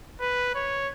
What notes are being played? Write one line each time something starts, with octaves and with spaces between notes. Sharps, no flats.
B4
C#5